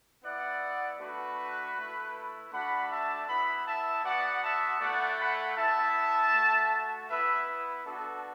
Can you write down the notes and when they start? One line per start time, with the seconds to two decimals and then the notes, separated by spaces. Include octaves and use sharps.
0.24 B3 E4 D5 F#5
1.00 A3 D4 F#4 B4
1.76 A3 E4
2.52 A3 D4 F#4 F#5 B5
2.91 E5 A5
3.28 B3 E4 F#5 B5
3.67 E5 A5
4.05 B3 F#4 D5 F#5
4.44 E5 A5
4.81 A3 E4 D5 F#5
5.19 F#5 B5
5.57 B3 E4 E5 A5
6.34 A3 F#4
7.10 B3 E4 B4 E5
7.48 B4
7.86 B3 D4 F#4 A4